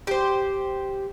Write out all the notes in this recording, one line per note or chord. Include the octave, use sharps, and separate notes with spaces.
G4 C5